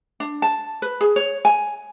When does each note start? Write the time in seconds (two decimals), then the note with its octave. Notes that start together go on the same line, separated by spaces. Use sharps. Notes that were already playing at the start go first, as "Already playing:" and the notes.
0.20 D4
0.42 A5
0.82 B4
1.01 G#4
1.16 C#5
1.45 G#5